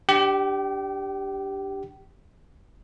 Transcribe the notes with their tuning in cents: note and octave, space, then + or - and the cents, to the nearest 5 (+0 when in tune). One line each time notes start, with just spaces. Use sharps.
D4 +0 G4 +0 G5 -35